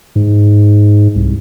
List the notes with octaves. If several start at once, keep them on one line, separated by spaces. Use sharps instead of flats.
G#2
C2